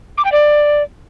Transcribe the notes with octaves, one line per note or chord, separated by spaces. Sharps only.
D6
G5
D5